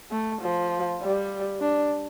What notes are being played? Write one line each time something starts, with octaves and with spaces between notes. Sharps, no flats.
A3
F3
G3
D4